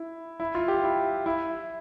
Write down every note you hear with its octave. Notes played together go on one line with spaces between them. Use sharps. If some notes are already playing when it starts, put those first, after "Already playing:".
Already playing: E4
E4
F4
G4
E4
E4